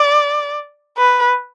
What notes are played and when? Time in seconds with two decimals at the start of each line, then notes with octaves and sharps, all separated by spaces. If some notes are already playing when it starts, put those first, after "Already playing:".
Already playing: D5
0.97 B4